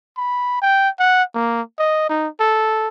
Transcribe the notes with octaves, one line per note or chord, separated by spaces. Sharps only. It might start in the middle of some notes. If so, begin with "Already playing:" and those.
B5
G5
F#5
A#3
D#5
D#4
A4